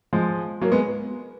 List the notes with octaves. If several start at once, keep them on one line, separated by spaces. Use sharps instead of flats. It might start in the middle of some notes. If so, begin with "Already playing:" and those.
F3 G#3
F#3 A#3
G#3 B3